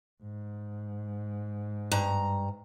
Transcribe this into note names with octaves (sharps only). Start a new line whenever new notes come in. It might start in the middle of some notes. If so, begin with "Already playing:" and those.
G#2
G2 A#5